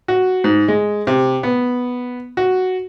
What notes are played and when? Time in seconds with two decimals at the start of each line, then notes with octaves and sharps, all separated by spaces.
0.08 F#4
0.44 G#2
0.68 G#3
1.07 C3
1.43 B3
2.37 F#4